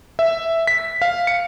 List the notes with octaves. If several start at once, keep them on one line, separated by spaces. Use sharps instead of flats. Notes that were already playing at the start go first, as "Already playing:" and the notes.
E5
B6
F5
C#7